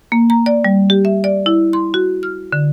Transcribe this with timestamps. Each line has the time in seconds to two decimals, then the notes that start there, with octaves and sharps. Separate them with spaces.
0.12 A#3
0.30 A#5
0.46 D5
0.65 G3
0.90 G4
1.05 E5
1.24 D5
1.46 E4
1.73 C6
1.94 F#4
2.23 F6
2.52 D3